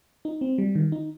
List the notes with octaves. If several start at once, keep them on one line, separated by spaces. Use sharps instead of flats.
D#4
C4
G3
D#3
D#4